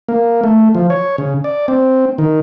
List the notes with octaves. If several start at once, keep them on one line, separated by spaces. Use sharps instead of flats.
A#3
A3
F3
C#5
C#3
D5
C4
D#3